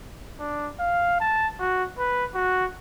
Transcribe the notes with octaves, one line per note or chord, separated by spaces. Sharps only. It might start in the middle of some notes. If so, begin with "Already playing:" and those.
D4
F5
A5
F#4
B4
F#4